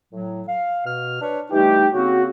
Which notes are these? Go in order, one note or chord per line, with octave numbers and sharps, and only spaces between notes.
A2 F#3
F5
B2 F6
D4 B4 C#5
E3 G3 A3 D#4 G4
C#3 A#3 C4 F#4